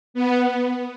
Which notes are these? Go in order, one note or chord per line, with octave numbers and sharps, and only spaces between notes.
B3